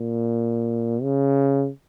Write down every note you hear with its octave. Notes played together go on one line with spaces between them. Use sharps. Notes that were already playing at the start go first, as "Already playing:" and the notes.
Already playing: A#2
C#3